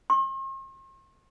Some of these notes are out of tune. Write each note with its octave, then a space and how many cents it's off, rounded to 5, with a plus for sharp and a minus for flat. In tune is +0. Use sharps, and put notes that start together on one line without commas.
C6 +45